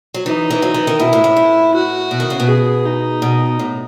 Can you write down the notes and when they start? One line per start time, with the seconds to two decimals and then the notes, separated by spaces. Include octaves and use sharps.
0.14 F#3
0.26 E3 D#4
0.51 E3
0.62 F#3
0.74 E3
0.87 D#3
0.99 B2 E4
1.13 A2
1.24 A2
1.37 A2
1.75 F#4
2.11 B2
2.20 D#3
2.30 C#3
2.40 B2
2.48 G#4
2.85 D#4
3.22 B2
3.59 A2